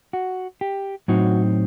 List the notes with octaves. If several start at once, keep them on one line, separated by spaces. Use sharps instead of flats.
F#4
G4
A2 F#3 C4 D#4 F#4